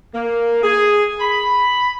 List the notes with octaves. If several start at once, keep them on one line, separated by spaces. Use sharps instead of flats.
A#3
G#4
B5